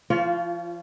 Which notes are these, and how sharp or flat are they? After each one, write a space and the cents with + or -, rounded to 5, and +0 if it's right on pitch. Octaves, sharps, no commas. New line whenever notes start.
F3 -25 F4 +0 C#5 +30